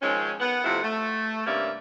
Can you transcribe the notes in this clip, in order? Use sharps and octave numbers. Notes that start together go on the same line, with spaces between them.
D#3 F3 G#3 C4 C#4
B3 F#5
F2 C3 F3 A3 E4 F#5
A3
G2 C3 A#3 C#4 D5 E5